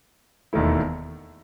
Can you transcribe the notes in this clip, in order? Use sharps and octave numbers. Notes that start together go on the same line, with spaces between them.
E1 D#2 D#3 A3 E4